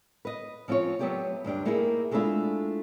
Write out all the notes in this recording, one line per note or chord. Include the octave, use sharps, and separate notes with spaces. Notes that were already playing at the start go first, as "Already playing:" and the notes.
B4 D#5
F3 C4 C#4 F4 C#5
F#3 A3 B3 G4 C#5 D5
D2 G2 D4 G4
A3 A#3 D#4 E4 G4 G#4
G#3 A3 C4 D4 E4 F4